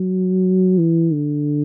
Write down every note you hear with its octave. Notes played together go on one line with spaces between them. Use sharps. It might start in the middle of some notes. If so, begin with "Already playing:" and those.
Already playing: F#3
E3
D3